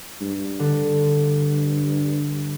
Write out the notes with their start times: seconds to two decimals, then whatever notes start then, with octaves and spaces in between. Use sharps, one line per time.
0.21 G2
0.59 D3